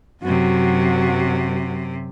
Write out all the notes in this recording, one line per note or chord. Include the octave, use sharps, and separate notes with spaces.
F#2 C3 F#3 F#4